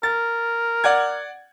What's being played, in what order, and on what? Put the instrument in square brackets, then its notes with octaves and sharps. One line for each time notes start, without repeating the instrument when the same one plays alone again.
[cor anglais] A#4 [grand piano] A6
[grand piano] D5 F#5 G#6